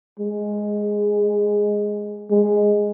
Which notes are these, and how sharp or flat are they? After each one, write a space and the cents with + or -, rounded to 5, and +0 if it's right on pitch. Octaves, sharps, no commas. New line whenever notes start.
G#3 +0
G#3 +0